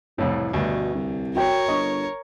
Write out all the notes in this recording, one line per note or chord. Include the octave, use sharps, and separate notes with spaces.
C2 F2 A2 E3 C#5
D2 G2 B2
C2
F#4 A#4 C#5 G5
G1 D#5 C#6